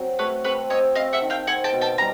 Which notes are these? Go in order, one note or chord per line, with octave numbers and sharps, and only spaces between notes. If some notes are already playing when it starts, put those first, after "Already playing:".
Already playing: F#3 C4
A3 B4 C#5
C4 B4 C#5
C4 C#5 D#5
C4 D#5 F5
E5 F#5
D#3
F5 G5
C4 F#5 G#5
G5 A5
B2
G5 A5
G3 A#5